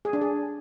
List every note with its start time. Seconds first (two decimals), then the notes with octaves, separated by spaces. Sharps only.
0.05 G#4
0.13 D4
0.21 G#4